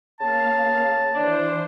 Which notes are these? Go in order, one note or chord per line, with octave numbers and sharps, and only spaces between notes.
C#3 A#3 F5 A5
E3 D4 C5